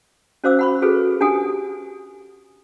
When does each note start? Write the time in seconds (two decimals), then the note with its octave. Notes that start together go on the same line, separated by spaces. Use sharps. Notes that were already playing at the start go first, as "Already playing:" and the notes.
0.44 C#4 F#4 C5 F5 D6 E6
0.59 F#5 B5 C#6
0.82 F#4 G#4 A4 B4
1.21 D4 G4 F#5 G#5 D#6